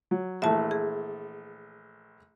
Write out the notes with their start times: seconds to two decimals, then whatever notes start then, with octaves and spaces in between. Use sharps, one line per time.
0.11 F#3
0.42 A#1 E3 A3 E5 A5
0.71 G#4